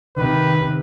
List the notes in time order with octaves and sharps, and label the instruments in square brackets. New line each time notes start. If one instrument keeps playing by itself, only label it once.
[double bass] C3 D#3 [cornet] B4